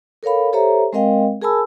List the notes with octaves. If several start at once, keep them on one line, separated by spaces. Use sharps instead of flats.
A4 A#4 C#5 F5 B5
G4 A4 C5 C#5 E5 A#5
G#3 C4 A#4 D#5 F5 G5
G#4 A#4 G#5 A5 B5 E6